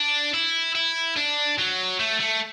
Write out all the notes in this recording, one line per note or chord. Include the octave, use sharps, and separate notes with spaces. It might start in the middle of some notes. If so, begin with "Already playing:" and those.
Already playing: D4
E4
E4
D4
F#3
A3
A3